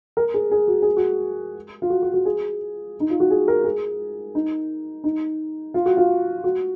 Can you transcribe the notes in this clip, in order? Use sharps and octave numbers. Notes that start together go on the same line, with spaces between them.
A#4
G#4
G#4
F#4
G#4
F#4
F4
F#4
F#4
F#4
G#4
D#4
F4
F#4
G#4
A#4
G#4
D#4
D#4
F4
F#4
F4
F#4